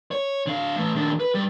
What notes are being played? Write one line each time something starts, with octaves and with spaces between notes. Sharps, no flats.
C#5
D3 F5
E3 A3
D#2 D4
B4
G2 G3